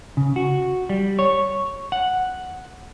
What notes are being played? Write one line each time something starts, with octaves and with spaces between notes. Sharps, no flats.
C#3
F#4
G3
C#5
F#5